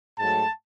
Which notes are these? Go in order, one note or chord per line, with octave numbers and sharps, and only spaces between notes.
G#2 F#3 A3 A5